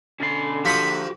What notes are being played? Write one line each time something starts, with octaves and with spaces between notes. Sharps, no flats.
B2 D3 C#4 C5 B5
F3 A#3 F#4 G4 E5 F#5 B5 D#6